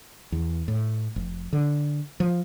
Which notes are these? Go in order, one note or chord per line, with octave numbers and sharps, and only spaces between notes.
E2
A2
F1
D3
F3